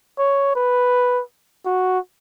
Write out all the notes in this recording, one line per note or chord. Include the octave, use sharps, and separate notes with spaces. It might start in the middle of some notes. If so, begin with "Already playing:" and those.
C#5
B4
F#4